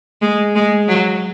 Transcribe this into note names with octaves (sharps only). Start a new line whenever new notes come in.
G#3
G#3
F#3